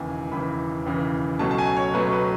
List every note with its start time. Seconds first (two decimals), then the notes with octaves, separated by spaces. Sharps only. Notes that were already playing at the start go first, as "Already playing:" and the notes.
Already playing: E1 D#2 C#3 E3 G#5
0.32 E1 D#2 C#3 E3 B5
0.86 E1 D#2 C#3 E3
1.39 C#2 B2 F#3 A3 C#4 A5
1.51 A5
1.58 G#5
1.77 C#5
1.94 C#2 B2 F#3 A3 C#4 B4
2.13 B4